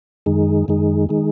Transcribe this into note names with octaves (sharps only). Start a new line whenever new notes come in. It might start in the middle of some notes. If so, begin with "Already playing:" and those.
F#2 D#3 G#3 D#4 G#4
F#2 D#3 G#3 D#4 G#4
D#3 G#3 D#4 G#4